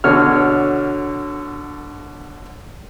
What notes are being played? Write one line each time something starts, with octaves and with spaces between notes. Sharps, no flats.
B2 D3 C#5 F6